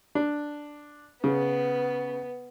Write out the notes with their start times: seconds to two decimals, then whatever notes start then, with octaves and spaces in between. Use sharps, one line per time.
0.15 D4
1.24 C#3 B3